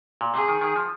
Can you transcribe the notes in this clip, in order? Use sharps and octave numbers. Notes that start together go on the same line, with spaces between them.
A#2
C3 G#4
D#3
D#3
F3